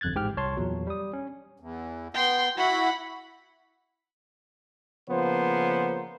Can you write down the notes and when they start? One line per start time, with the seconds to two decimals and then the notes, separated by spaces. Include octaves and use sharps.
0.01 G1 F2 F#6 G#6 A6
0.15 A1 G#2 G4 G5 F6
0.37 C2 C#5 A5 C6
0.57 E2 A#2 F#3
0.87 G3 D#6
1.13 C#4
1.60 E2
2.14 B3 G5 C6
2.57 E4 F#4 F#5 B5
5.08 C#3 F3 A#3 B3 C5